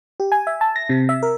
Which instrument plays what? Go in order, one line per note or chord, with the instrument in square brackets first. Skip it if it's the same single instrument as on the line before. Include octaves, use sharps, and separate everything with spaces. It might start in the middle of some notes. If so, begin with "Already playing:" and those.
[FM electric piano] G4
G#5
E5
A5
A#6
C3
E5
A#4